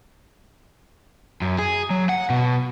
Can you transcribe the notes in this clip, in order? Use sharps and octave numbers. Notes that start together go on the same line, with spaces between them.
F#2
G#4
F#3
F#5
B2